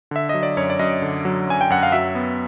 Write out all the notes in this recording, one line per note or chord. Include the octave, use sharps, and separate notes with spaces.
D3 E5
F#3 D#5
D5
F#2 C#5
D5
F#2 D#5
D3
F#3
F#2 G#5
G5
F#2 F#5
F5
F#3 E5
B3